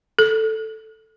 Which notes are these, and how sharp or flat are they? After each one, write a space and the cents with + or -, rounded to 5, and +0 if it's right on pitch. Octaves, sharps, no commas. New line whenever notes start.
A4 +0